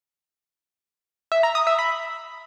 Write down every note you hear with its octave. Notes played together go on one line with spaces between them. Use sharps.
E5
A#5
D#6
E5
B5